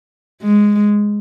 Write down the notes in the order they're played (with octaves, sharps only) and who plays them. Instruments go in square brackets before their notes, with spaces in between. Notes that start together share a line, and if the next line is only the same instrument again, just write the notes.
[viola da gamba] G#3